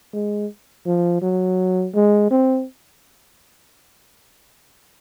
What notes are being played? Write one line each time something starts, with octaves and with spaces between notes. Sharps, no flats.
G#3
F3
F#3
G#3
C4